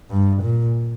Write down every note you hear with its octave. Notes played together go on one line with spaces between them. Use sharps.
G2
A#2